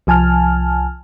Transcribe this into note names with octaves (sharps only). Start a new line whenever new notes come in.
C2 F3 G#5 A5 F6